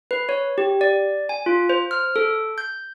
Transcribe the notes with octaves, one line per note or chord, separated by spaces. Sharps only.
B4
C#5
G4
D5
G#5
F4
C5
F6
A4
G6